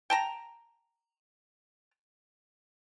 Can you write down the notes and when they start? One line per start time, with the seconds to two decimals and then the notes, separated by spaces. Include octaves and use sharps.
0.10 G5 A5 A#5